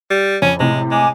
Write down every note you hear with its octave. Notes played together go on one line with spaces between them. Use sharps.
G3
F2 C#4
A2 C3 G#3
G#3 G#5 D6